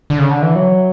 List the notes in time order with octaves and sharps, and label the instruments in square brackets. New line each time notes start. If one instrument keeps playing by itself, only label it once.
[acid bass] D3
C#3
D3
E3
F#3